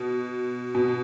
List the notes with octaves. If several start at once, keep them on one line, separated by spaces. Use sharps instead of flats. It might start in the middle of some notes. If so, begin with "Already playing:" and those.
Already playing: B2
B2